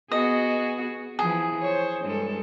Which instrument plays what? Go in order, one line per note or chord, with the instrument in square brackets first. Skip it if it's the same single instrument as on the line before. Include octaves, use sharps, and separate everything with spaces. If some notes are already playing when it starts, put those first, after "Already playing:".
[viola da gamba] B3 F#4 G#4 [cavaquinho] D#5
[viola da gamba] E3 F3 [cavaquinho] G#4
[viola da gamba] C5 C#5
G2 G#3 A4